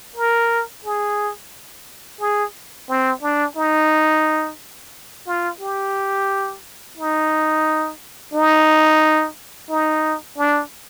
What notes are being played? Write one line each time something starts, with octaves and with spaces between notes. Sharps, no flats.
A#4
G#4
G#4
C4
D4
D#4
F4
G4
D#4
D#4
D#4
D4